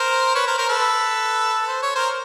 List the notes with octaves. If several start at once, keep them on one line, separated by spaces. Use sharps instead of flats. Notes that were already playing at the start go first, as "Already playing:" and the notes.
Already playing: A#4 C5
B4 C#5
A#4 C5
A#4 C5
A4 B4
C5
C#5
A#4 C5